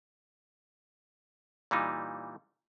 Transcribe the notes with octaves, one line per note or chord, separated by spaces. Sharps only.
A#2 E3 G3 D#4